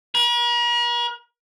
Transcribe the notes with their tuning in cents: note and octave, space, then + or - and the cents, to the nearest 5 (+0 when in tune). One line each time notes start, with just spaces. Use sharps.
A#4 +45